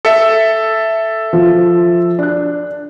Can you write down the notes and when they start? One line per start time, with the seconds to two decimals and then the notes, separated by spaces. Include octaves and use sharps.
0.05 A4 E5 C#7
1.33 F3
2.19 D4 F#6